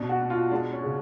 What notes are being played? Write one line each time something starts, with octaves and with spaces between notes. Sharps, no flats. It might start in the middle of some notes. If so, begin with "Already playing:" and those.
Already playing: B2 D4
F#4
B2
F4
G#3 D4
C#4
C#3